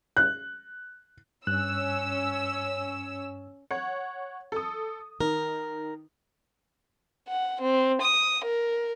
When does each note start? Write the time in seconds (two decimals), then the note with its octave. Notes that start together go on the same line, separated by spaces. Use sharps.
0.17 F#6
1.47 G2 C#4 E6 F#6
3.71 C#5 F#5
4.52 A4 D#6
5.21 D#3 A#4
7.28 F#5
7.61 C4
8.01 D#6
8.44 A#4